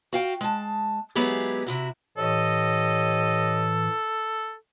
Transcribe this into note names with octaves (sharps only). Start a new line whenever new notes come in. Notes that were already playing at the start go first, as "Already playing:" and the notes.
F#4 F5 G5
G#3 A5
F#3 G#3 B3 E4 G4 G#4
C3 E4 F#4
A2 E3 G4 A4 C#5 D#5